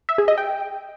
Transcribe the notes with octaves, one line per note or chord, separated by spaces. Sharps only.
E5
G#4
D#5
G5